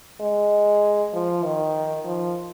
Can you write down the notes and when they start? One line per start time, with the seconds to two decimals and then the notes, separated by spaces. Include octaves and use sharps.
0.21 G#3
1.14 F3
1.44 D#3
2.05 F3